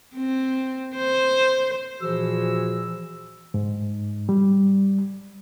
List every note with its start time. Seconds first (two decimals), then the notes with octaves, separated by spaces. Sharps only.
0.16 C4
0.96 C5
2.00 A#2 E3 F3 F#4 G#4 E6
3.54 G#2
4.29 G3